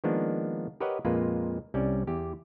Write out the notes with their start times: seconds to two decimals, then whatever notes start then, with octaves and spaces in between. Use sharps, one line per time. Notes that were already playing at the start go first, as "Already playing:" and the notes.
0.04 D#3 F3 G#3 A#3 B3 D4
0.80 G4 A#4 B4 C#5 D#5 F#5
1.05 F2 A#2 G#3 A#3 F4 B4
1.74 C2 G3 C#4 D5
2.07 E2 G4